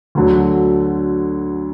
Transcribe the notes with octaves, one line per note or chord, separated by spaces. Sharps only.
D2 D3 F#3